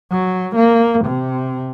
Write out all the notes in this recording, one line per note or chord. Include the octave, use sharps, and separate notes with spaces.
F#3
A#3
C3